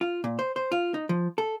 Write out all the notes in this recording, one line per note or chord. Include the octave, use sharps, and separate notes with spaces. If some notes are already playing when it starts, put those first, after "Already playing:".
F4
A#2
C5
C5
F4
D#4
F3
A4